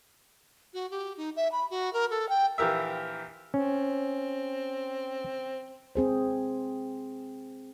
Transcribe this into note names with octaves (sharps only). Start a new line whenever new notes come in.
F#4
G4
D#4
E5
B5
F#4
A#4
A4
G5
A#1 E3 G4 A#4 E5
C4 C#4
C4 G#4 C5